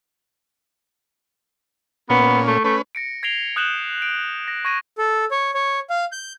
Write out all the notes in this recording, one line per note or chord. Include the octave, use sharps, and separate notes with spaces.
A#2 B3 C#4
A3
A3 C#4 B4
A#6 C#7 D7
G#6 A#6 C7 D7 F7 G7
D#6 F#6 G6 E7 F#7 G7
D7
A#6
C#6 G#6 A#6 D#7
A4
C#5
C#5
F5
G6